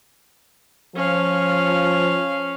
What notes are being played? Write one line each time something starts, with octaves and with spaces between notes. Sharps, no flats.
F3 C#4 F5